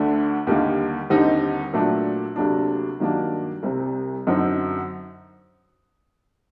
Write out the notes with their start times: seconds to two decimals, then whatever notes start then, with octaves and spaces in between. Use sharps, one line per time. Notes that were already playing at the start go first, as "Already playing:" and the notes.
Already playing: D2 D3 A3 D4
0.47 D#2 D3 G3 A#3
1.10 D#2 D3 G3 C4 D#4
1.73 A#2 F#3 A3 D4
2.36 D2 C3 F#3 A#3 D4
3.00 G2 D#3 F#3 A#3 D4
3.63 C2 C3 G3 C4
4.27 F#2 D3 F#3 C4 D#4